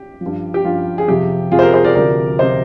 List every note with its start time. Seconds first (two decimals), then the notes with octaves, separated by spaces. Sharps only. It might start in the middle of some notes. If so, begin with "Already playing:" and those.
Already playing: G4
0.21 F3
0.26 G2
0.54 G4
0.65 G2 F3 F4
0.98 G#4
1.08 F2 C3 F3 G4
1.51 F2 C3 F3 F4 G#4
1.59 C5
1.62 G4 A#4
1.74 G#4 C5
1.84 A#4 D5
1.95 D2 C3 F3 A#4 D5
2.39 C3 F3 C5 D#5